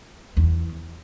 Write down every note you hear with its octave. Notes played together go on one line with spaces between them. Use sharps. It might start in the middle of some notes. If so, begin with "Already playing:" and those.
E2